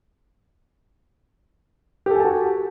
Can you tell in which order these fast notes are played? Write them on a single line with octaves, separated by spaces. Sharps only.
G4 A4 G#5 A5 F#4